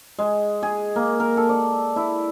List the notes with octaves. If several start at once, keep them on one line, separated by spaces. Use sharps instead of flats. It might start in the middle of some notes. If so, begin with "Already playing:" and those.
G#3
G#4
A#3
A#4
A4
D5
E4